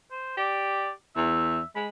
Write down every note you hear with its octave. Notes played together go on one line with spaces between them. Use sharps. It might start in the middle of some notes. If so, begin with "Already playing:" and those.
C5
G4 D5
E2 E5
G#3 B5